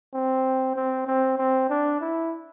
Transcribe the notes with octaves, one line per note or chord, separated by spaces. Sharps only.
C4
C4
C4
C4
D4
E4